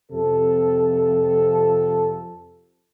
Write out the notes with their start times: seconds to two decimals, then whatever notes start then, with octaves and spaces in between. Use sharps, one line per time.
0.12 F2 C3 A4